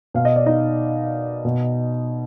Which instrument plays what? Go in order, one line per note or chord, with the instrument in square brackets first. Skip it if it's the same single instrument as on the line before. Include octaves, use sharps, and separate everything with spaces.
[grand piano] B2 F5
D#5
D5
D#4 D#5
B2